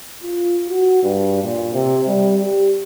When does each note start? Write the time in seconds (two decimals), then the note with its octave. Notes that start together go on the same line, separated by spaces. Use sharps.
0.23 F4
0.69 F#4
1.03 G2
1.43 A#2
1.73 C3
2.07 G3
2.43 G4